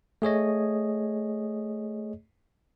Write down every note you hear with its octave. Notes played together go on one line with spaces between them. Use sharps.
A3 G#4 C#5 D#5